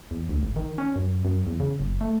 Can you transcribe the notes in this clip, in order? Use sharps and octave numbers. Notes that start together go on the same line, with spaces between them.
E2
D2
G#1
D#3
C#4
F#2
F#2
E2
C#3
F#1
A3